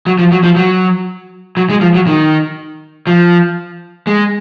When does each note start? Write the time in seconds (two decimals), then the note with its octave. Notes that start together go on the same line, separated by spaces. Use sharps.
0.06 F#3
0.19 F3
0.32 F#3
0.44 F3
0.56 F#3
1.57 F#3
1.70 G#3
1.81 F3
1.94 F#3
2.07 D#3
3.07 F3
4.07 G#3